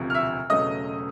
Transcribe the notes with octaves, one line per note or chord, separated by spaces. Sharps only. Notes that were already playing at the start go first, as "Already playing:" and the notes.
Already playing: E1 D2 C3 F3
F6
E5 E6
E1 E2 C#3 F#3 A3 D#5 D#6